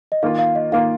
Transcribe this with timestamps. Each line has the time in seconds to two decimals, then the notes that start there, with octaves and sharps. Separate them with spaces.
0.12 D#5
0.23 D#3 A#3 F4 F5
0.39 F5
0.55 D#5
0.72 D#3 A#3 F4 F5